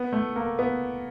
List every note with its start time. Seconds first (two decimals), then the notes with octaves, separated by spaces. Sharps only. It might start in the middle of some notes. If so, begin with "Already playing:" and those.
Already playing: B3
0.13 A3
0.36 A#3
0.59 B3